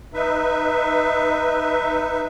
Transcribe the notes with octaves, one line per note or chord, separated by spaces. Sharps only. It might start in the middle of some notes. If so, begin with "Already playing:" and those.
D#4 B4 E5